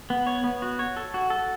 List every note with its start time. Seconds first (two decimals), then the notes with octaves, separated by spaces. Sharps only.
0.10 B3
0.27 C#5
0.44 B3
0.62 F#4
0.79 C#5
0.97 A4
1.14 F#4
1.30 A4